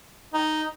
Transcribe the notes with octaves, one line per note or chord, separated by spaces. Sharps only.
D#4